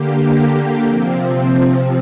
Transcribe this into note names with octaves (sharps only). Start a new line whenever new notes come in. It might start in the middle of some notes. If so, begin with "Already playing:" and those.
Already playing: D3 A#3 G4
C3 F3 C4